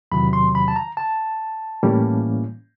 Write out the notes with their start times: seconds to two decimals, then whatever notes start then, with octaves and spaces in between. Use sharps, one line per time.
0.12 E2 C3 D#3 F#3 B5
0.33 C6
0.55 B5
0.68 A5
0.76 A#5
0.97 A5
1.83 A2 E3 G3 A#3 C#4